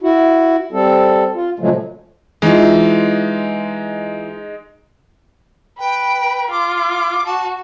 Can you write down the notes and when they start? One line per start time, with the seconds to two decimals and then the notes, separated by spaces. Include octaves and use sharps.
0.02 E4 F#4
0.72 G3 C4 A4
1.35 F4
1.59 A#2 C#3 F3 F#3 G#3 A3
2.42 E3 G#3 D#4 F4
5.79 B4 G5
6.51 F4 D6
7.26 F#4 A5